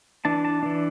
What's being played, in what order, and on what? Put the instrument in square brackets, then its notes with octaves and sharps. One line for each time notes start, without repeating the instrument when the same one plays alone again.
[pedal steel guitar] E3 D4 A5
A5
E3 D4